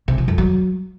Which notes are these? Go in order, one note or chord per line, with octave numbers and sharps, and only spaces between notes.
C3
F3
F2
F#3